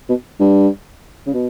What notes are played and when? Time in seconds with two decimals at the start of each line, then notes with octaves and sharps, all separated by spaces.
0.09 B2
0.40 G2
1.27 C#3
1.34 B2